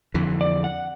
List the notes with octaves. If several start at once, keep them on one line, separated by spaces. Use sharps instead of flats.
F2 D3 E3
D5
F#5